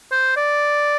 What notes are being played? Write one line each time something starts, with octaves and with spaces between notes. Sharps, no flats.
C5
D5